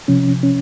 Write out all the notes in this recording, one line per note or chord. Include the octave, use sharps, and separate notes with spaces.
C3 F3 C#4
C#4